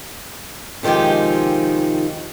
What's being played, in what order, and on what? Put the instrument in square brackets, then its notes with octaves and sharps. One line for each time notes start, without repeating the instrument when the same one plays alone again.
[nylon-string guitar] C3 D#3 F3 G#3 G4